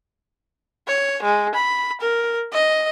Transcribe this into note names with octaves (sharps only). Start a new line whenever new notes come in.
C#5
G#3
B5
A#4
D#5